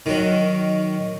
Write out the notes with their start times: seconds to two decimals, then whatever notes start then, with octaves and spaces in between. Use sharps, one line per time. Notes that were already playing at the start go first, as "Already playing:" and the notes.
0.06 D#3 F#3